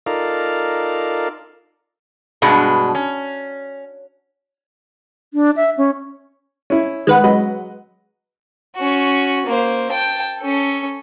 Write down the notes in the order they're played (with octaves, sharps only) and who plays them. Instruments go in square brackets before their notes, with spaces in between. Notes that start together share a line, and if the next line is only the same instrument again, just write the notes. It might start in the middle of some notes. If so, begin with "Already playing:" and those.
[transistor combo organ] D#4 F4 A4 A#4 D5 F5
[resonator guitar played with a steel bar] G2 B2 G#3 D4
C#4
[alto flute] D4
E5
C#4
[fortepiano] C#4 E4
[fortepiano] D#3 [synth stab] G#3 B4 F#5
[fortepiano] F#3 D#5 B5
[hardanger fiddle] C#4 F#4
A#3 C5
G5 A5
C#4 A4